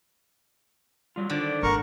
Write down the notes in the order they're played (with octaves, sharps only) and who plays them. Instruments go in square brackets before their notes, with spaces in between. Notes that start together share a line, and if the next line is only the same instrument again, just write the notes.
[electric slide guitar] F#3 G3 F4
[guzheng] D3 [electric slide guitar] D#3 C5 D5
[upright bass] G#1 [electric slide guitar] A#2 F#5 [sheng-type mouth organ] A#4 C#6